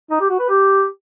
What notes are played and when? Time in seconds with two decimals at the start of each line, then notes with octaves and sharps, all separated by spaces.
0.11 D#4
0.20 G4
0.30 F#4
0.40 B4
0.49 G4